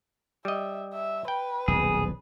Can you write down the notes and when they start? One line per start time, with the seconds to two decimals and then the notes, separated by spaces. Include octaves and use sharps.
0.45 G3 D#5 E5
0.93 E5
1.28 B4 G5
1.68 D#1 B1 E2 G#4